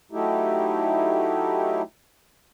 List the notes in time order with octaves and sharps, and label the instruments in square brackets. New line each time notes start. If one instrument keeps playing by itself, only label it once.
[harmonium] F#3 A3 D#4 E4 G4